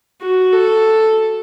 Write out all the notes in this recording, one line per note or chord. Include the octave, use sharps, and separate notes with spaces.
F#4
A4